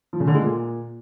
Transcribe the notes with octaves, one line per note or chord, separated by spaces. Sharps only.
F3
C#3
D3
G#3
A#2